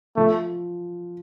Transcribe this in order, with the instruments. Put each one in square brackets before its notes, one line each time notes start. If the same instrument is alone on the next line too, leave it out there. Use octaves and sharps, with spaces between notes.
[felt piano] F3 [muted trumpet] A3